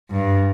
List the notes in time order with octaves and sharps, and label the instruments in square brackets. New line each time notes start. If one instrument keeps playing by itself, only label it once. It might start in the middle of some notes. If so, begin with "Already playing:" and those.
[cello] G2